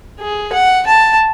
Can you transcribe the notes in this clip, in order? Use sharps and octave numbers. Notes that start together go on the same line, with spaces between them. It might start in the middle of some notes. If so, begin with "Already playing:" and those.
G#4
F#5
A5